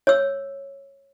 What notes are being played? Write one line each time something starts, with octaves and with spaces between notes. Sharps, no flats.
C#5 E6